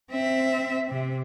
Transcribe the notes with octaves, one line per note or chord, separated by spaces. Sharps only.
C4 E5
C3